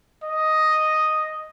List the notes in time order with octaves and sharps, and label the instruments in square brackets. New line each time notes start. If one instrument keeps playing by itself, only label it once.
[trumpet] D#5